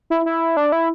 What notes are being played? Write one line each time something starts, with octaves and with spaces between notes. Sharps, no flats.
E4
E4
D4
E4